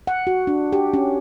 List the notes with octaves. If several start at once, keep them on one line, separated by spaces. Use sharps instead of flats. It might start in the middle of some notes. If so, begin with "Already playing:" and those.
F#5
F#4
D4
G4
C#4